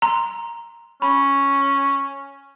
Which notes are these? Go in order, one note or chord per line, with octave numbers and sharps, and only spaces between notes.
A#5 C6
C#4 B5